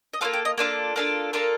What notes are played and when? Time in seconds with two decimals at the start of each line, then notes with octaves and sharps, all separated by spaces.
0.13 D#5
0.21 A#3 D4 F4 A4 F5
0.34 G5
0.45 D#5
0.58 A#3 D4 F4 A4
0.96 A#3 D4 F4 A4
1.33 A#3 D4 F4 A4 A#4